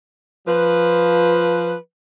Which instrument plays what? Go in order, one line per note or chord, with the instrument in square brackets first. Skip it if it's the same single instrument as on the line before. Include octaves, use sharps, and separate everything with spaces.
[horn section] F3 B4